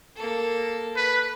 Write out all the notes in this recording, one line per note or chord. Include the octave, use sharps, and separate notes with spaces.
A#3 A4
B4